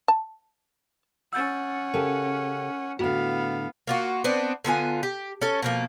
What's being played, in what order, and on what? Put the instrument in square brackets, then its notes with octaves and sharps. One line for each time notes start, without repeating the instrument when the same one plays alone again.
[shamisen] A5
[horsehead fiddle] C#4 F#5 [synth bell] E6 G6 A6
[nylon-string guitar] C#3 G4 A4 [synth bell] A#4
[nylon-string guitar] A2 D3 [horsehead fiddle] B3 F5 [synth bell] F#4
[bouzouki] A#3 F4 F#4
B3 C4 D4
D3 B3 F4 G#5
G4
C#4 A4
B2 F3 A#3